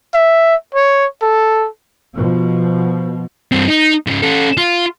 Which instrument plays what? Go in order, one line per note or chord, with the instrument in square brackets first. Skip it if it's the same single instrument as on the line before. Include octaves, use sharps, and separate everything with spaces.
[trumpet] E5
C#5
A4
[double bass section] B2 F3
[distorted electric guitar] G2 C4
D#4
G#2 C#3
C#4 A4
F4